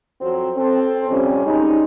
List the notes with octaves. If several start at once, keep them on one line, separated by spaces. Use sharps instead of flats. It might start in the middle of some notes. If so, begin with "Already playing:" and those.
F2 F#3 C4
C4 A4
F2 C3 G3 C#4
G3 G#3 C#4 D#4